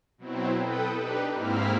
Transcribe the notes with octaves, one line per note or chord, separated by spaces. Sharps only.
B2 F#3 C4 E4
A4 B4 G5 D#6
D4 D#4 G4 B4
G#2 A#3 C4 E4 F6 B6